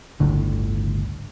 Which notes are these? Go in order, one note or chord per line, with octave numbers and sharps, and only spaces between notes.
G1 C#2 A2 D3